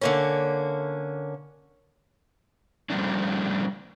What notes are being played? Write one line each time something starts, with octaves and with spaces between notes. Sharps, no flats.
D3 A#3 C#4
F3 G3 A3 A#3 C#4 D4